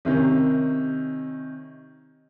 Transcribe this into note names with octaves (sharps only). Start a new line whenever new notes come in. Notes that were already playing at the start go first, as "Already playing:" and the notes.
C3 D#3 C#4